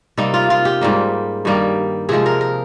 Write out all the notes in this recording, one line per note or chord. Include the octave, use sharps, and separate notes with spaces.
C3 G3 A#3 D#4
F4
F4
G4
G#2 G3 A#3
G2 D#3 G3 A#3
C3 F3 G#3 G#4
A#4
A#4